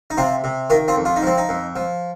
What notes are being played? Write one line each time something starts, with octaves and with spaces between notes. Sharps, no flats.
D#4
C3 C4 F4
C3
D#3 F4 A#4
C4 F4
F2
F4
D#4
F3 C4
D#4
F2
F3